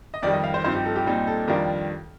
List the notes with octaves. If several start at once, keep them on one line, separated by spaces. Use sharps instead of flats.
D#5
F2 D#3 G3 D5
D#5
F5
C5
G2 F3 C4 D#4 C5
G4
A4
G4
A#2 G3 C4 D#4
A4
F2 D#3 G3 D4 F4 A#4